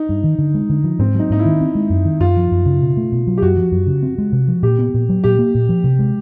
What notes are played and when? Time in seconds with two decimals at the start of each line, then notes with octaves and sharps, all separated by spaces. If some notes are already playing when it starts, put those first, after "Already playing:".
Already playing: D#4
0.09 G2
0.24 D#3
0.39 D3
0.54 G#3
0.69 D3
0.84 F3
0.99 G#2 C4
1.15 F#3 D#4
1.30 G#2 D#4
1.39 E4
1.45 D#3
1.61 C4
1.75 G#3
1.90 F#2
2.05 D#3
2.20 F#2 F4
2.36 F3
2.51 F#2
2.66 C#3
2.81 B2
2.97 A3
3.12 B2
3.27 F#3
3.38 G4
3.42 F#2 F#4
3.58 F3
3.72 F#2
3.87 C#3
4.03 C4
4.18 G#3
4.32 C3
4.48 F3
4.63 A#2 G4
4.79 B3
4.94 A#2
5.09 F#3
5.24 A#2 G4
5.39 A#3
5.55 A#2
5.69 F3
5.84 C3
5.99 G#3